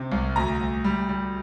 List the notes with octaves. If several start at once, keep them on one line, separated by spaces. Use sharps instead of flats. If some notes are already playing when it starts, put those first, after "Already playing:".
Already playing: C3
C2
D2 A#5
D2
G3
G3